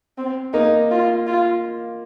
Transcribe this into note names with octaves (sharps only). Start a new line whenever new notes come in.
C4
A#3 D#4
F4
F4